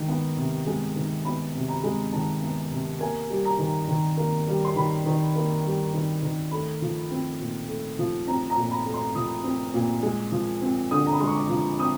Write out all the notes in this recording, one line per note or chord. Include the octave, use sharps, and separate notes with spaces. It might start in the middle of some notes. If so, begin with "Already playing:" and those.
Already playing: D#3 G#3
B3
C3
G#3
D#3
B3 B5
C3
A#5
G#3
D#3 A5
B3
C3
A#3 G#5
G3
A#5
D#3
D#3
A#3
G3
C6
D#3 B5
D#3
A#3
G3
D#3
D#3
A3 B5
F3
C4
A#2
A3
F3
C4 A#5
A#5
A#2
B5
A3
C6
F3 D#6
C4
A#2
G#3
F3
C4
D3 D#6
A#5
B5
G#3 C6
C#6
D6
F3
C4 D#6